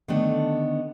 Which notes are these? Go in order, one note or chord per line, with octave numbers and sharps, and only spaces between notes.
D3 D#3 A3 B3 D4